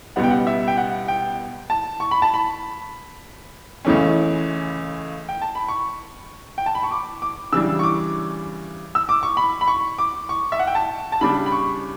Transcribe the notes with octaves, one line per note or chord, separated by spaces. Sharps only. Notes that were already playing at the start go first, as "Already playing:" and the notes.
C#2 B2 G3 B3 F#5
G5
F#5
E5
G5
F#5
G5
A5
C#6
B5
A5
B5
C#2 C#3 E3 A3 C#4
G5
A5
B5
C#6
G5
A5
B5
C#6
D6
D6
C#3 E3 G3 D4 E6
C#6
D6
E6
D6
C#6
B5
B5
C#6
D6
C#6
E5
F#5
G5
A5
A5
C#3 G3 D4 B5
B5
C#6